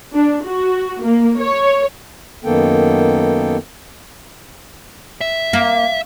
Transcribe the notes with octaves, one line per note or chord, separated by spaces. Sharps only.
D4
F#4
A#3
C#5
F#2 D#3 A#3 B3 A4 G5
E5
A#3